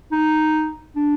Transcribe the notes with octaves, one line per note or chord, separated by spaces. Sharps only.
D#4
D4